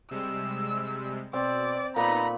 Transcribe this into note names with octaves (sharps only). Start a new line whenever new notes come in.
C3 G3 G#3 E6
B2 C4 D5
A#2 B3 D#4 A#5 B5